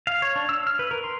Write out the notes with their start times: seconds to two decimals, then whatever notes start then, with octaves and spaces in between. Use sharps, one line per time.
0.07 F5
0.22 C#5
0.36 D4
0.49 E6
0.67 F6
0.79 B4
0.91 A#4
1.04 C6